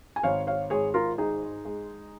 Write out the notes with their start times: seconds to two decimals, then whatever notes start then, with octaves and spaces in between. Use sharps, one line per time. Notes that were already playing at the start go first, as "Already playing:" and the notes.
0.16 G#5
0.23 G#1 C#5 F5
0.47 C#5 F5
0.70 G#2 G#4 C#5
0.94 F4 A#4
1.18 G#3 D#4 G#4
1.65 G#3